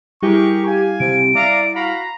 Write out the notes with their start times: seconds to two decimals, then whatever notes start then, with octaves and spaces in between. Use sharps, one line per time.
0.23 G3 E4 G4 G#4 A#4 C#6
0.66 F5 G#5
1.00 C3 D7
1.35 D5 E5 F5 A#5
1.75 F#4 F5 A#5 B5